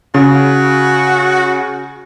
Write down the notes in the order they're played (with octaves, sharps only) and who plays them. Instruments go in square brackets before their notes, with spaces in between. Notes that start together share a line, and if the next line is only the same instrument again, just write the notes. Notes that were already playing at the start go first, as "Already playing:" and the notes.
[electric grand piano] C#3 [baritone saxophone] F#4